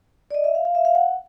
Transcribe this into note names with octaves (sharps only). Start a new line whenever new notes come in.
D5
D#5
E5
F5
F5
E5
F5
F#5